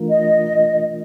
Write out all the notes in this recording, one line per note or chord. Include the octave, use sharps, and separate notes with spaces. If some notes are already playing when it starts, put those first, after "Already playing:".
Already playing: E3 A3 D4 F4 A#4
D#5